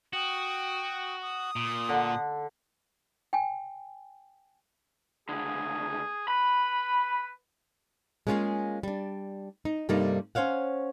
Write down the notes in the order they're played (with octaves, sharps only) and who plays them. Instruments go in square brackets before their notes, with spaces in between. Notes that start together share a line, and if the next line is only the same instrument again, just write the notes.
[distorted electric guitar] F#4 [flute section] G5 D#6
[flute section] D#6
[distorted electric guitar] A#2
[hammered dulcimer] D3
[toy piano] G5 G#5
[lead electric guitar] C#2 D3 [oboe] G#4
[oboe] B4 [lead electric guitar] B5
[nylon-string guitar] G#3 A#3 C#4 D4 F4 G#4
G3 D4
D#4
G2 C3 G3 A3 A#3 D#4
C#4 C5 C#5 F5 F#5